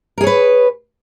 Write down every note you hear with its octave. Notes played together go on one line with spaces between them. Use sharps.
G#4 A#4 B4 C#5